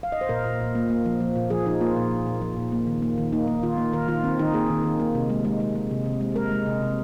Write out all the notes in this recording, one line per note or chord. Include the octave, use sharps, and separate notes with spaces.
F5
D#5
C5
A#2 A#4
A#2
A#2
A#3
A#3
F3
F3
A#2
F3 G#4
F3 D#4
A#3 F4
A#2
A#2
A#2
F3
A#2
A#3
D#3
A#3
D#3
A#3 D#4
A#3
D#3 F4
A#3
D#3 A#4
D#3 F4
D#3 C4
D#3 D#4
A#3 G#4
D#3
D#3
A#3
C3
G#3
G#3
G#3
G#3
C3
C3
G#3
G#3 A#4
G#3
C3
C3